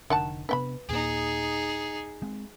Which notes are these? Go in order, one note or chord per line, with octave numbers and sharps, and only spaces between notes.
F1 B1 D3 D#3 F#5 A5
C3 B3 D4 B4 G5 B5
D#2 A#2 A#3 D#4 G#4
G#3 C4